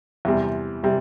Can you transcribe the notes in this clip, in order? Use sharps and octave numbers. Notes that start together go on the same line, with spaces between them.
E2 C3 G3
C3 G3